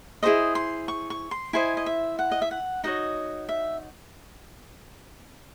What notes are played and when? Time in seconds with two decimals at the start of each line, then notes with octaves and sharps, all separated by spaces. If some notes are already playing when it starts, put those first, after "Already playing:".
0.23 E4 G#4 C5 D#5
0.55 C6
0.88 C#6
1.10 C#6
1.31 C6
1.53 E4 C5 D#5 G#5
1.77 D#5
1.86 E5
2.19 F#5
2.31 D#5
2.42 E5
2.51 F#5
2.84 D#4 F#4 C#5 D#5
3.49 E5